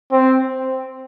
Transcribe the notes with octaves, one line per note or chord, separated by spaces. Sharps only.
C4